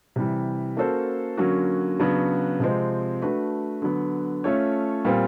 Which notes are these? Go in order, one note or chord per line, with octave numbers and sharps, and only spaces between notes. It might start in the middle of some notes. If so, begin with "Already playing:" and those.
C3 E3 G3
A#3 C#4 F#4 A4 C5
D3 F#3 A#3 C#4 F#4
C#3 F#3 B3 D4 F#4
C3 F3 G#3 C4
A3 D4 F#4 B4
D3 F#3 B3
A3 C#4 F4 A4 C#5
A#2 G3 C4 F4